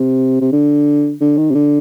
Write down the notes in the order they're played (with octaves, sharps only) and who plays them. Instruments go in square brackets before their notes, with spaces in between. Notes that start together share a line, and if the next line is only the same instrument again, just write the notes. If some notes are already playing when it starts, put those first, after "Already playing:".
Already playing: [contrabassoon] C3
C3
D3
D3
D#3
C3
D3